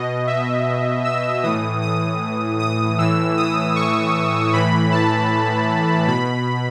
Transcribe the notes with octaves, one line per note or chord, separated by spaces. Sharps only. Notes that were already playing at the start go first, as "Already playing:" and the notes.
Already playing: B2 D#5
E5
E6
A2 E3 D#6
D#6
D#6
A2 E3 E6
D#6
C#6
A2 E3 B5
A5
B2 B5